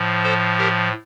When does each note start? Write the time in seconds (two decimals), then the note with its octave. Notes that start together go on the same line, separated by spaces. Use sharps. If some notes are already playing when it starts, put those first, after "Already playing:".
Already playing: A2 F3
0.23 A4 C5
0.58 G4 A#4